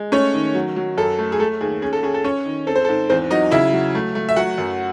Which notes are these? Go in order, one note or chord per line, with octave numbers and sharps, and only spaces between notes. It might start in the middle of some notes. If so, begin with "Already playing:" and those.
Already playing: G#3
A3 C#4 C#5
D#3
F#3
F#3
F#2 A4
A3
G#4
A3 A4
D#2 G#4
C#4 G#4
A4
C#4 G#4
A4
C#4 C#5
D#3
C4 A4
C5
A4
G#2
E2 C4 C5
F#3 D#4 D#5
C#3 E4 E5
F#3
A3
A3
E5
F#3 F#4 F#5
F#2